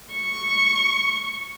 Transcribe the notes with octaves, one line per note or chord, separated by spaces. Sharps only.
C#6